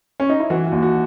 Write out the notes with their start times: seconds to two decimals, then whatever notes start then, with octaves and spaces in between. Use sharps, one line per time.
0.20 C#4
0.29 D#4
0.40 E4
0.50 E3 F#4
0.67 F#4
0.72 D#2
0.83 F#4